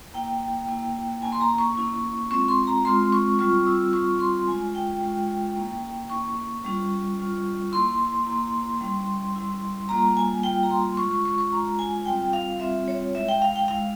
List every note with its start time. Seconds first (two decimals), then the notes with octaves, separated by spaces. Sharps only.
0.14 A#3 E4 G5
0.69 A#3 E4
1.22 A#3 C#4 E4 G#5
1.32 C6
1.41 A#5
1.58 C#6
1.77 A#3 C#4 E4
2.31 G#3 C4 F4 C#6
2.48 C6
2.67 A#5
2.85 G#3 C4 F4 C6
3.12 C#6
3.39 G3 C4 F4 C#6
3.66 E6
3.93 G3 C4 F4 C#6
4.20 C6
4.47 G#3 C#4 F4 G#5
4.75 G5
5.01 G#3 C#4 F4
5.56 A#3 C#4 E4
6.10 A#3 C#4 E4 C#6
6.37 C#6
6.64 G3 C#4 F4
7.19 G3 C#4 F4
7.72 A#3 E4 C6
8.26 A#3 E4
8.81 G3 C#4 E4
9.35 G3 C#4 E4
9.89 G3 A#3 F4 A#5
10.17 G#5
10.43 G3 A#3 F4 G5
10.63 A#5
10.71 C6
10.97 G#3 C#4 F4 C#6
11.11 C#6
11.25 C#6
11.38 C#6
11.51 G#3 C#4 F4 A#5
11.79 G#5
12.06 G3 C4 F4 G5
12.33 F5
12.60 G3 C4 F4 E5
12.88 C#5
13.15 G#3 E4 E5
13.29 G5
13.42 F5
13.56 G5
13.68 G#3 E4 F5